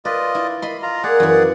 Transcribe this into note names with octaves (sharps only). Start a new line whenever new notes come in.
F4 B4 D5 D#5
E4
D#5 B5 C6
F4 A#5
A#3 G#4 D5 F#5
F#2 E3